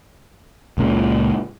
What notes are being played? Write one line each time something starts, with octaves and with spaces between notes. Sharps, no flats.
C#2 A#2 C#3